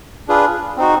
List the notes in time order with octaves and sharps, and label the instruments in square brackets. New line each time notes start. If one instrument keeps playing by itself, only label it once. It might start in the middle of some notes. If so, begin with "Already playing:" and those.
[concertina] D4 F4 G#4 B4
C4 D#4 F#4